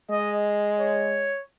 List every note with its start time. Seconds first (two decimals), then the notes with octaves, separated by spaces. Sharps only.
0.10 G#3 D#5
0.80 C#5